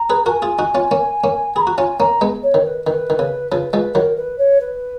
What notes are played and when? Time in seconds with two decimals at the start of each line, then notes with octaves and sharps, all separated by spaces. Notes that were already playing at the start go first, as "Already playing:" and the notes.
Already playing: A#5
0.10 G#4 B4
0.26 F#4 A#4 G#5 A#5
0.42 F4 G#4
0.59 D#4 F#4
0.75 C#4 F4
0.91 A#3 C#4
1.24 A#3 C#4
1.56 G#4 B5
1.61 A#5
1.67 F#4
1.78 C#4 F4 G#5
2.00 A#3 C#4 A#5
2.21 G#3 B3
2.43 C#5
2.54 D#3
2.65 B4
2.86 D#3 B4
3.10 D#3
3.19 C#3
3.52 C#3 F3 B4
3.73 F3 G#3 B4
3.95 D#3 F#3 A#4
4.16 B4
4.38 C#5
4.61 B4